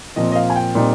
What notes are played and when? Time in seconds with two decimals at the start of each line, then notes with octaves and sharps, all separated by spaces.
0.16 A#2 F3 C4 D#5
0.32 D#5
0.36 F5
0.50 G#5
0.56 G5
0.75 A#2 G3 C4 D#4